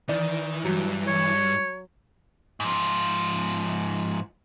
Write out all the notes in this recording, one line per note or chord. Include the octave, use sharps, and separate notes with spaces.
D#3 E3 D5
G2 F#3
C#5
G#2 F3